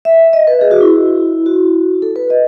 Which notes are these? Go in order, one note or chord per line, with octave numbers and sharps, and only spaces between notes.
E5
D#5
B4
G#4
F#4
E4
F#4
A4
B4
D#5